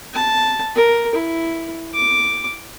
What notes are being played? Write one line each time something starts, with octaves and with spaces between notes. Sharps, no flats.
A5
A#4
E4
D6